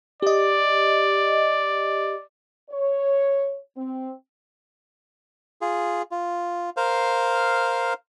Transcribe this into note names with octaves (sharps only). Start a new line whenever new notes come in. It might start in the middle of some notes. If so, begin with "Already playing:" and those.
G4 D5 D#5
C#5
C4
F4 G#4
F4
A#4 C5 F5